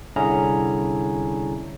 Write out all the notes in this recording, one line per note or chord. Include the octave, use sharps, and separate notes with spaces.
C2 D3 C#4 E4 G#4 A#5